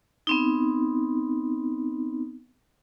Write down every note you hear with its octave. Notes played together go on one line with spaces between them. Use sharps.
B3 C4 D#4